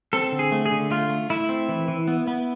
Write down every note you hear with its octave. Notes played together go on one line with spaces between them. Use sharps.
C4 A4
D3
G#4
A3
G#4
D3
A3 F4
A3
A3 E4
C4
E3
E3
B3
B3